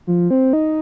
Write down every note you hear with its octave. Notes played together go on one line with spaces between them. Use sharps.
F3
C4
D#4